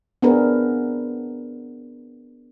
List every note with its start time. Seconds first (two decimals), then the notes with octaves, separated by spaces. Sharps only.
0.22 B3 C4 D4 G#4 A#4 B4